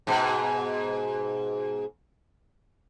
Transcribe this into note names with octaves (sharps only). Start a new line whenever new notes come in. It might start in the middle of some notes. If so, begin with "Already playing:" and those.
G#2 B2